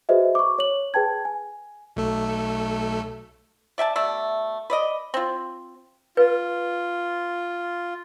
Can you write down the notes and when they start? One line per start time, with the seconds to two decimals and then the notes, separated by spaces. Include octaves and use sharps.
0.09 F#4 G#4 B4 C5 D#5 E5
0.35 C#6 D6
0.59 C#5 F#7
0.94 G#4 B4 G5 A5 G#6
1.25 G#5
1.96 B1 A3 A4
3.78 D5 E5 G5 A5
3.96 B2 A3 D5 E5
4.70 B4 D5 D#5
5.14 C4 F4
6.17 F4 B4